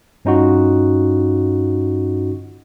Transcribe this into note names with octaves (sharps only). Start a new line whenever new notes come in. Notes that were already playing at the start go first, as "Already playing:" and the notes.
G2 C#4 D#4 F4 F#4